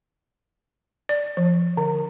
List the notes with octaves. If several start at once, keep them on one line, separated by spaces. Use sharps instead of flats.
D5
F3
D3